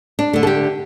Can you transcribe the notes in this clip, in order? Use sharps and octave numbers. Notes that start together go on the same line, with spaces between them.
D4
D3 A3
A4
G4